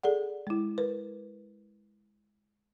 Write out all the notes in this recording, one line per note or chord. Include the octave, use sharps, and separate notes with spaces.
G#4 A4 D5 F#5
G#3 E4
A#4 B4